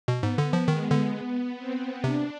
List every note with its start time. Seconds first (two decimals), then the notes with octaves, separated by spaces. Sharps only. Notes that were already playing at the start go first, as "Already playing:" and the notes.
0.08 B2
0.23 G#2 B3
0.38 D3
0.53 F3
0.68 D#3 G#3
0.91 D3
1.14 B3
1.58 C4
2.04 C3 D4